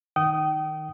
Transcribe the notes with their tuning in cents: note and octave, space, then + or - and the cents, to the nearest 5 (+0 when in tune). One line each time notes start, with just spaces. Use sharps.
D#3 +0 G5 -30 D#6 +0